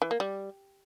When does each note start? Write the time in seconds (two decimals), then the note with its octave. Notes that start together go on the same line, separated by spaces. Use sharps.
0.02 E3
0.11 A#3
0.20 G3